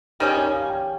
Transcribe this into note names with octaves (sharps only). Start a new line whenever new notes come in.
D#3 G3 C#4 G4 G#4
C#5
F5
G#5
G5